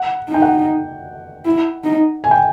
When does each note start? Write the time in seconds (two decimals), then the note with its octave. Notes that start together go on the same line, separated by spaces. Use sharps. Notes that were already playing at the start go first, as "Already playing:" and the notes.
Already playing: F#5
0.29 D#4
0.34 G5
0.42 F#5
1.45 E4
1.84 D#4
2.24 G#5
2.31 G5